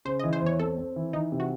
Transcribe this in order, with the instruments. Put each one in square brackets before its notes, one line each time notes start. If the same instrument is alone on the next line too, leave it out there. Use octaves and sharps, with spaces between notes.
[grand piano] C#3 [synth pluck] C5
[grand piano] E3 [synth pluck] D#5
[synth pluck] C5
[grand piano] E2 [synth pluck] C#5
[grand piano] C4 [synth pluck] A4
[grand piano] C4
E3
[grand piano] E3 [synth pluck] D#4
[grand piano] C3
[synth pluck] F#4